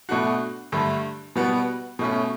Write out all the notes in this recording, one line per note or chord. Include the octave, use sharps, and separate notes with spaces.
B2 A3 D4 F#4
G2 D3 A3
B2 G3 B3 F#4
B2 A3 C#4